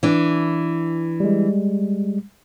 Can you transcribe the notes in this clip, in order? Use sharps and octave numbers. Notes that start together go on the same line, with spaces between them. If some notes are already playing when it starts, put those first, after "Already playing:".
E3 D4
G3 G#3